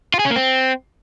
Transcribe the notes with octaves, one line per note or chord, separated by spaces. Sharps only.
F4
G#4
C#4
A#3
C4